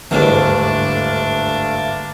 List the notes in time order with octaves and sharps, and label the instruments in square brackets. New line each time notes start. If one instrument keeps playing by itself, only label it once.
[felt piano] G1 [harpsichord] D#2 G#2 E3 [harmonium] A3 F5 [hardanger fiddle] D4